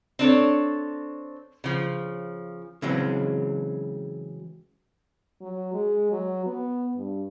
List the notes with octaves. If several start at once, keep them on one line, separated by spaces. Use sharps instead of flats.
C4 D4 A4 C#5
C#3 F3
C#3 E3 F#3 G#3 C4
F#3
G#3
F#3
B3
G2